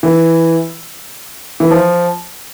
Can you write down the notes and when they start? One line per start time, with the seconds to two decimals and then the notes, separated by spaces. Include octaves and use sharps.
0.03 E3
1.60 E3
1.71 F3